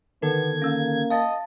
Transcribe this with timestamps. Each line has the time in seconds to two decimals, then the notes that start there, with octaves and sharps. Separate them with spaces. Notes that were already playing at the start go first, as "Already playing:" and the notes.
0.22 D3 D#3 B3 A4 A#4 G#6
0.62 A#3 C#4 E6
1.10 D#5 F5 A5 A6